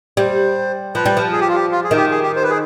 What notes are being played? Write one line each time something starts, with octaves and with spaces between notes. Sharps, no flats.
G3 C5
F3 B4
G3
F3
G#4
G4
F4
G4
F4
G#4
D#3
G4
G#4
G4
C5
B4
G#4